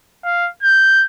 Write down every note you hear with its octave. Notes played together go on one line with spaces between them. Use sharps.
F5
G6